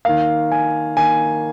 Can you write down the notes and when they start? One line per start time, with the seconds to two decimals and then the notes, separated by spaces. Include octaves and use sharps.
0.05 D#3 A#3 F5
0.52 G#5
0.97 D#3 A#3 G#5